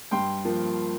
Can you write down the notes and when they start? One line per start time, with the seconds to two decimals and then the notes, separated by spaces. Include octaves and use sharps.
0.11 G2 G5 C6
0.45 F3 A#3